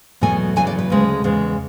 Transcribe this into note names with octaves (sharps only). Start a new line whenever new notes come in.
E2 B2 F#3 A3 G#5
E2 C#3 F#3 G#5
D5
B4
D2 C#3 G#3
E2 C#3 G#3